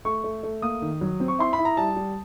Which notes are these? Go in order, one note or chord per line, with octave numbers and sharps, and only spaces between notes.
A3 C#6
A3
A3
A#3 D#6
D#3
F#3
C4
C#6
E4 C6
B5
E4
A#5
G3 A5
G3